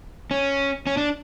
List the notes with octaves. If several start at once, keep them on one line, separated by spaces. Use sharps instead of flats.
C#4
C#4
D4